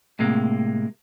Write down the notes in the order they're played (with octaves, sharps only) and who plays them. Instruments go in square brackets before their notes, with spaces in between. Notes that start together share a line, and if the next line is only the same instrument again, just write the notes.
[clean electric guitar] A2 C3 G#3 A#3